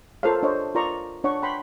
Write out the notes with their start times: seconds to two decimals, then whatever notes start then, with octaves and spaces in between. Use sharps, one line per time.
0.23 F4 A4 A#4 C5 C#5 F5
0.43 D4 C5 C#5 D#5
0.75 F4 A#4 D5 A#5 C6 C#6
1.24 D4 C#5 F#5 C#6
1.42 F#5 G5 B5 C6